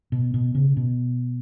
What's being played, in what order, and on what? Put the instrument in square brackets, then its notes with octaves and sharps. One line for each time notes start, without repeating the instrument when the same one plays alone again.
[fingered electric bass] B2
B2
C#3
B2